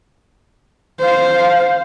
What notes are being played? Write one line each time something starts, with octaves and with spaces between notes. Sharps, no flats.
C5 F5